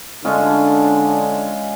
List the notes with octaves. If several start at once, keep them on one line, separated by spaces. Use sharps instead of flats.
D3 G#3 C#4 D4 F4